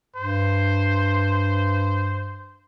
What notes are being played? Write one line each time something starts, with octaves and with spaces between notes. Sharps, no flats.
G2 C5